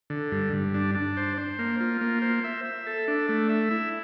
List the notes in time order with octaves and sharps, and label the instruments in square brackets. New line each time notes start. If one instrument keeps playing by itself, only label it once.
[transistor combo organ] D3
G2
G2
D4
D4
C5
C5
A#3
F4
A#3
C5
E5
E5
A4
D4
A3
E5
E4